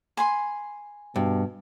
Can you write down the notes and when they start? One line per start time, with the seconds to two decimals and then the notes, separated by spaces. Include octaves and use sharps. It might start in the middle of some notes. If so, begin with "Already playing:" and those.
0.17 G#5 B5 C6
1.16 G2 B2